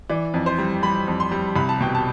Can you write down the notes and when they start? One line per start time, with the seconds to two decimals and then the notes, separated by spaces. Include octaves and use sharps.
0.09 E3 D5
0.34 F2
0.46 C5
0.58 G3
0.83 G3 B5
1.07 F2
1.20 C6
1.32 G3
1.56 C2 B5
1.69 A5
1.80 B2 G5
1.95 A5